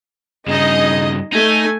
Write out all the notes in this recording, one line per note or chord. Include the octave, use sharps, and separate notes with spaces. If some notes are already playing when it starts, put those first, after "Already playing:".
G2 C#3 D#4 G#4 D#5
A3 D#4 G#5